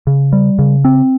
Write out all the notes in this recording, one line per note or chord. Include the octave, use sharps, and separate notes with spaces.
C#3
G3
C#3
C4